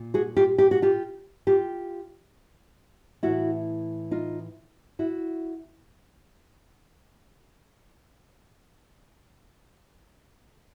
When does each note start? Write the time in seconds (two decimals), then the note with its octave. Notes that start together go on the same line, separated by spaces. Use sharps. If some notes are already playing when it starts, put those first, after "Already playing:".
Already playing: A#2
0.14 F#4 G#4
0.37 F4 G4
0.58 G4
0.71 F#4
0.82 F4 G4
1.47 F4 G4
3.23 A2 E3 E4 F#4
4.11 D#4 F4
4.99 E4 F#4